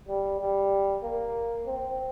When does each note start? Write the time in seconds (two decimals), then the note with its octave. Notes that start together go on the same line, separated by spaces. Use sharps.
0.08 G3
0.39 G3
1.03 A#3
1.66 C4